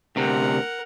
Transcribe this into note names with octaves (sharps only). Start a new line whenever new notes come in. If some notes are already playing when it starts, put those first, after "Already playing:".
D2 C3 A#4 F#5